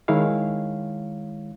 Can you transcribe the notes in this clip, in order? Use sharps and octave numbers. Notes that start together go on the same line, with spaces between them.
D#3 G#3 E4 C#5 F5